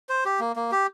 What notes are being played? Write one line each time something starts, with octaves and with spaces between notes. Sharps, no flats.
C5
G4
A#3
A#3
G4